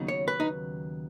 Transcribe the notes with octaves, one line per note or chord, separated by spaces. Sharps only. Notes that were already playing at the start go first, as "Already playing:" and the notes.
Already playing: D#2 C#3 F#3 B3 D#4
C#5
B4
D#4